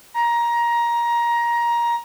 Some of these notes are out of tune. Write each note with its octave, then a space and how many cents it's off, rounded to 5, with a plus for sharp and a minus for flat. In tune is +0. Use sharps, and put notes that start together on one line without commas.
A#5 +20